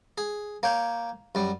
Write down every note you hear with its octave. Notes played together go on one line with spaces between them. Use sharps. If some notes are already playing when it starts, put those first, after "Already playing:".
G#4
A#3 C#5 G5
F#2 G3